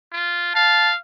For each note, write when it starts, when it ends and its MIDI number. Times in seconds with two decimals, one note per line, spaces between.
0.12 0.51 65
0.55 0.97 77
0.55 0.89 81